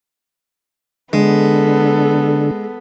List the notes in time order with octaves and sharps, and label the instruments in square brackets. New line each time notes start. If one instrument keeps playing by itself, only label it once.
[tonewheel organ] D3 [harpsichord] G#3 [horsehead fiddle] B3 A4